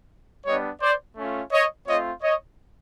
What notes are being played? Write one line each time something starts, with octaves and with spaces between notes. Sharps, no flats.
G3 B3 D4 C#5 D#5
C5 D5
A3 C#4 F4
C#5 D#5
A3 C4 F4 C#5 D#5
C#5 D#5